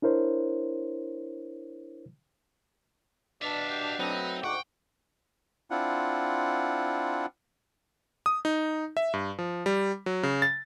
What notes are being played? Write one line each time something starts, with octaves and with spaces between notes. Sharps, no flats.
D4 E4 A#4 C5 C#5
B2 D4 D5 E5 F5
G4
F#3 A3 C4 D#4 B4
D2 G#2 F#5 G5 C#6 D6
C4 D4 E4 F4 F#5
D#6
D#4
E5
G2
F3
G3
F#3
C#3
A6